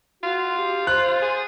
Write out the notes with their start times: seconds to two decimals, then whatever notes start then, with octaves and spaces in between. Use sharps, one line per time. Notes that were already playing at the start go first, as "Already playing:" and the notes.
0.23 F4 F#4
0.57 G4
0.87 C5 F#6
1.22 G#4